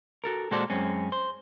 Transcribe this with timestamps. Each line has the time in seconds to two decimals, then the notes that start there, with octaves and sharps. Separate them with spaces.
0.24 F#4 A4 A#4
0.51 A#2 G#3 F#4 A4 C5 D5
0.70 F#2 G#3 C4 C#4
1.12 C5